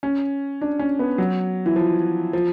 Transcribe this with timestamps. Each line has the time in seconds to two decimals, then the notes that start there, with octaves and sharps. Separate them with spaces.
0.03 C#4
0.61 D4
0.79 C#4
0.99 B3
1.18 F#3
1.66 E3
1.76 F3
2.33 F3